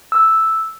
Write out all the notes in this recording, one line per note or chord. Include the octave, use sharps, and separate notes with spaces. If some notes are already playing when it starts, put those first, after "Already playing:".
E6